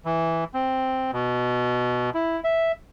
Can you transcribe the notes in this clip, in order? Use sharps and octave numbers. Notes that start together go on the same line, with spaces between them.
E3
C4
B2
E4
E5